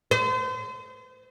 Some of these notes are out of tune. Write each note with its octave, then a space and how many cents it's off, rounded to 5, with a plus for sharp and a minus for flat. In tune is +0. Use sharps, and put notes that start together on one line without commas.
C5 -40